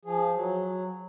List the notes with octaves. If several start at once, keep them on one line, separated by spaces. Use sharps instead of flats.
F3 G#4
F#3